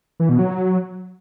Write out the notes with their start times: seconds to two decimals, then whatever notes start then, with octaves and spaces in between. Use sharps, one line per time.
0.20 E3
0.29 B2
0.39 F#3